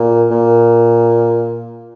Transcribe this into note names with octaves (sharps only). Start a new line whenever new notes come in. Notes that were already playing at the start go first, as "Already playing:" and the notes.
Already playing: A#2
A#2